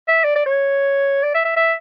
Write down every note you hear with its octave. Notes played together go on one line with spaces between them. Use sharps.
E5
D5
D5
C#5
D5
E5
E5
E5